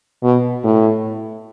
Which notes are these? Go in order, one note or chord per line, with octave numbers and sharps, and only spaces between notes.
B2
A2